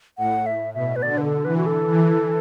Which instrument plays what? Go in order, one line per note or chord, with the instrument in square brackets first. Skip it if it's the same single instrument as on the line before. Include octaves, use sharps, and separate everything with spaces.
[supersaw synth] A2 [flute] F#5
[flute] E5
[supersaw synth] B2 [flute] E5
[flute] B4
[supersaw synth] D3 [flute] D5
[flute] B4
A4
[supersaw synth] E3 [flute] B4
[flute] F#4
A4
[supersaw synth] E3